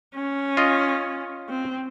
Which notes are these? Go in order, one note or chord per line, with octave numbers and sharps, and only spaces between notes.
C#4
F4 D#5
C4